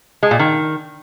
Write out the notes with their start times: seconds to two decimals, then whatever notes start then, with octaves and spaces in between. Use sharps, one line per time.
0.23 G#3
0.31 A#2
0.39 D#3